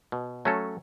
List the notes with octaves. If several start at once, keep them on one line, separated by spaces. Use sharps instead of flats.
B2
F#3 A3 C#4 A4